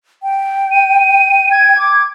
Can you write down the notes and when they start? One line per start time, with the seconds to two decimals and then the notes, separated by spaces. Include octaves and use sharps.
0.23 G5
0.71 D#7
1.51 G#6
1.78 D6